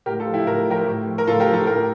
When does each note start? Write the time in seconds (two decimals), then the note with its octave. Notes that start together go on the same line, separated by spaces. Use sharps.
0.06 A2 G4 A#4
0.19 F4 A4
0.26 F3
0.33 E4 G4
0.47 A2 A#4
0.67 F3 G4 A#4
0.87 A2
1.07 F3
1.18 A#4
1.27 A2 F4 A4
1.40 G4 A#4
1.47 F3
1.53 F4 A4
1.67 A2 G4 A#4